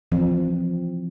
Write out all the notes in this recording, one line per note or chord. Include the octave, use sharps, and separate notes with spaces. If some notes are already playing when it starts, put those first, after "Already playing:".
E3 F3 C4